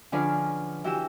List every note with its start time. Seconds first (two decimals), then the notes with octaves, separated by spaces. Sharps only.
0.12 D3 F3 C#4 D4 G#4 B4
0.84 E3 F#4 G4 E6